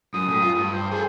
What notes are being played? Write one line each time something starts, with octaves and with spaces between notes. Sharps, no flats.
F#2 D#6
A2
F4
G2
C5
G#4 A4